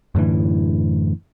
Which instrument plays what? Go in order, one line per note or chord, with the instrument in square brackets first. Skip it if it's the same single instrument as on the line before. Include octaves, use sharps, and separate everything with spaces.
[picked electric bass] F#2 A2 D3 E3